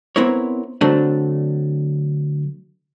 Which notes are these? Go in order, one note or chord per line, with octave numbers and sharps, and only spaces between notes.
B3 C4 E4 A#4 C#5
D3 F#3 A3 C4 D4